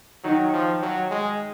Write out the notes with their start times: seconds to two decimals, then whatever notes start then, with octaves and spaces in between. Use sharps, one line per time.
0.24 D#3 F#3 D#4
0.53 F3
0.82 F#3
1.11 G#3